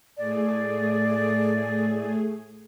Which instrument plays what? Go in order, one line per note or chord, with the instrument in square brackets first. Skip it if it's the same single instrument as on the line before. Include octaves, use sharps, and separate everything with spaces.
[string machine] A2 A3 G#4 [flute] D5